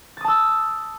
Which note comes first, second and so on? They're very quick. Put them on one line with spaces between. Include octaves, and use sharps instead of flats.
A6 D#6 A5 E6